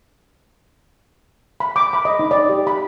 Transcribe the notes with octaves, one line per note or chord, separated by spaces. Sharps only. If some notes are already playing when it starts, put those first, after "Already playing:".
B5
D6
B5
D#5
D#4
D5
G4
B5